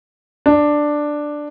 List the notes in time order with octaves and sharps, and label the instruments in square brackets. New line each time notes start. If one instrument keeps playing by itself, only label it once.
[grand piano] D4